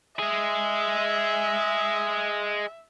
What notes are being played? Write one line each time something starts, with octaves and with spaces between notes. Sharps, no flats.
G#3 G#4 E5